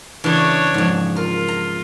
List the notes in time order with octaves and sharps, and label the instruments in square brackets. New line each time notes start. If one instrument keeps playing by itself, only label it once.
[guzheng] C#3 E3 [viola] D4 C#5
[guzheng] F2 G#2
[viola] F4 [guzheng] A#4
[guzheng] A#5